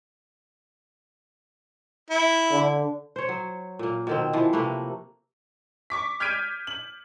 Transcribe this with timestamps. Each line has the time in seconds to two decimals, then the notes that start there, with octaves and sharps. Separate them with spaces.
2.10 E4
2.52 D3
3.16 C5 C#5
3.29 F#3
3.79 A#2 A#3
4.07 B2 D#3 C4
4.33 E3 F3
4.53 C3 A3 A#3 B4
5.90 C#6 D6 B6
6.20 F6 G6 G#6 B6 D7 D#7
6.67 F#7